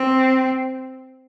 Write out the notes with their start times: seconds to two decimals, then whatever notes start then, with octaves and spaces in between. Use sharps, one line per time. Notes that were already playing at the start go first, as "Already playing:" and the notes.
Already playing: C4